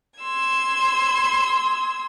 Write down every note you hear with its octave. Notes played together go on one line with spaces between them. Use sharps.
C6 E6 G#6